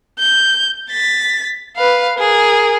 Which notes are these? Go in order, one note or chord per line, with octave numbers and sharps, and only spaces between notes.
G6
A6 B6
B4 F5
G#4 A#4